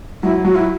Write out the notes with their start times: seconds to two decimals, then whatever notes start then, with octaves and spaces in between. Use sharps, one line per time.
0.23 F#3 E4
0.45 F#3 F#4
0.55 E4